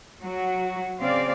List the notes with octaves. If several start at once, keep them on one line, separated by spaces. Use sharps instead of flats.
F#3 F#4
C#3 C4 D5 F5